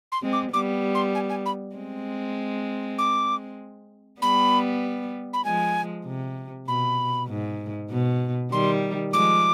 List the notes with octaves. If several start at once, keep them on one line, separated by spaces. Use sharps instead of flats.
C6
G#3 C4
D6
G3 B3 D6
C6
G#5
G#5
B5
G#3 C4
D6
G3 B3 B5
B5
F3 G#3 G#5
C3
B2 B5
G#2
B2
D#3 G3 C6
F3 G#3 D6